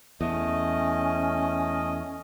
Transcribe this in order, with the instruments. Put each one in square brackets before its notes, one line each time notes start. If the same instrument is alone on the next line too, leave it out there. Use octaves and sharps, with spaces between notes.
[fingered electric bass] E2 [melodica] A3 D#5 [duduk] C#4